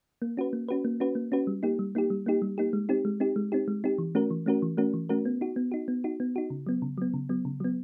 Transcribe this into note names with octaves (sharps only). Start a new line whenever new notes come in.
A#3
C#4 F#4 B4
A#3
C#4 F#4 B4
A#3
C#4 F#4 B4
A#3
C#4 F#4 B4
G3
A#3 D#4 G4
G3
A#3 D#4 G4
G3
A#3 D#4 G4
G3
A#3 D#4 G4
G#3
C4 D#4 G4
G#3
C4 D#4 G4
G#3
C4 D#4 G4
G#3
C4 D#4 G4
E3
A3 C#4 F#4 A#4
E3
A3 C#4 F#4 A#4
E3
A3 C#4 F#4 A#4
E3
A3 C#4 F#4 A#4
B3
D#4 F#4
B3
D#4 F#4
B3
D#4 F#4
B3
D#4 F#4
C#3
F#3 B3
C#3
F#3 B3
C#3
F#3 B3
C#3
F#3 B3